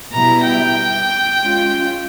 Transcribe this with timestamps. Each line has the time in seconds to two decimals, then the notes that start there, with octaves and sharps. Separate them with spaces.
0.12 B2 G3 B3 E4 A#5
0.44 G5
1.39 G#3 C#4 F4